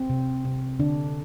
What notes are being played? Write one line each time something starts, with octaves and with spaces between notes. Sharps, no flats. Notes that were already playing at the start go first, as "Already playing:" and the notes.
Already playing: C4
C3
C3
D3 D4